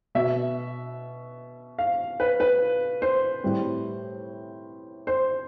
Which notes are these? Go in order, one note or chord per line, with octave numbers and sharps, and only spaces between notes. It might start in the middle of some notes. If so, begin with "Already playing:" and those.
B2 B3 E5
F5
B4
B4
C5
A2 G3 C4
C5